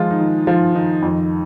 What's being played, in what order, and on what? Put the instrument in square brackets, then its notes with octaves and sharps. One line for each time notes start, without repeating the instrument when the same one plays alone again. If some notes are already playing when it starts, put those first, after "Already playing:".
Already playing: [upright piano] D#3 F3 G#3 F4
D#4
D#3
D#3 F3 F4
D#3 D#4
F2